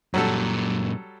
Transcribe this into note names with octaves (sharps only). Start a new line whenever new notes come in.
F#2 A#2 F#3 G3 A4